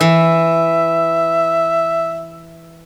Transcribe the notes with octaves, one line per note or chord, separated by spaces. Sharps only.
E3 E5